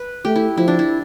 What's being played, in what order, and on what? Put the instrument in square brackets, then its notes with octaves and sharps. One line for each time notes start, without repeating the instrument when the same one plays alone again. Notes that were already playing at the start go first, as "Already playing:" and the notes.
Already playing: [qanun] B4
[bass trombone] A3 [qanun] G4
[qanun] E4
[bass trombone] F3 [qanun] E4
[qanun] D4
E4